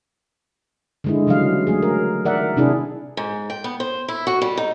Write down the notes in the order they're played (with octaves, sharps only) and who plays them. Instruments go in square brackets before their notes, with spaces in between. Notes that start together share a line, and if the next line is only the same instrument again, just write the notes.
[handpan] D3 G#3 E4
C#3 E3 F#3 G3 F5
F#3 A3 G#4
A#4
D#3 A#4 D5 E5 F#5
C3 D4 E4 G#4
[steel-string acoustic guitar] G#2
G5
B3
C5
E4
F#4
G3
D#4